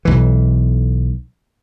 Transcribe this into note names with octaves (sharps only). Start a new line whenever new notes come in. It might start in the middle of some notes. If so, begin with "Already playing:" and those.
B1 E3